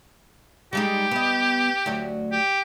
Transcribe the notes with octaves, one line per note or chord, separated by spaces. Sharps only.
G3 G#3 D#4 G4
B3 D#5
D2 F#3
G4